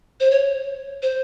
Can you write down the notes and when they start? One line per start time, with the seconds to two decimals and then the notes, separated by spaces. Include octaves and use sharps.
0.20 C5
0.31 C#5
1.03 C5